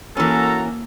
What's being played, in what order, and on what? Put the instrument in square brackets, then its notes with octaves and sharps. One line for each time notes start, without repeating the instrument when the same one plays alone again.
[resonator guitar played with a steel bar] E3 C#4 [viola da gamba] A#3 [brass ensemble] F#4 A#4 A#5 [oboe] A4